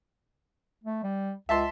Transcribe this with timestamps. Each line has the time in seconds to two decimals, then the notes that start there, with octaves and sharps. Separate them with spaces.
0.84 A3
1.03 G3
1.49 C#2 E5 A5 C6